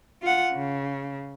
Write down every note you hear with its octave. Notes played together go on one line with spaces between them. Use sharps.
F4 F#5
C#3